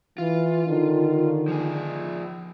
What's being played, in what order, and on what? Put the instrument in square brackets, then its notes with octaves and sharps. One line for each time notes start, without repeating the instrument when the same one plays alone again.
[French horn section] E3 [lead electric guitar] F4
[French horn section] D3 D#3
[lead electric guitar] F3 G#4